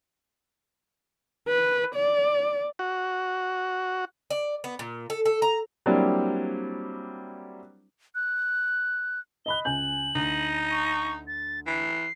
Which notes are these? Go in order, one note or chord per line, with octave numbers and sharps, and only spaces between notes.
B4
D5
F#4
D5
B3
A#2
A4
A4
A#5
F#3 G3 A#3 C4 D4 E4
F#6
D#5 B5 F#6 G7
C#2 G#5 G6 F#7
D2 D#4
C#6
A6
E3 C7